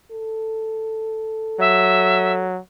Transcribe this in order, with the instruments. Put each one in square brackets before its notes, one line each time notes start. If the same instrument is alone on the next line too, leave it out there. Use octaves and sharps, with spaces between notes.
[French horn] A4
[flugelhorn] F#3 [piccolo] E5